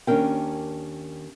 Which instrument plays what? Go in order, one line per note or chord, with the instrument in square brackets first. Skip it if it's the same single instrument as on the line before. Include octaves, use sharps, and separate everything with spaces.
[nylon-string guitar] D#2 C#4 D4 A#4 G5